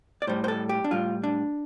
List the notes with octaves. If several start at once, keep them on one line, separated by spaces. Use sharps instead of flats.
D5
A2 G3 C5
C5
A4
G4
D4
A2 G3 F4
D4